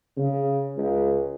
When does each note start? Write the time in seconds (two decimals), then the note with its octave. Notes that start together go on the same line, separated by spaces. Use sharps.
0.17 C#3
0.77 C#2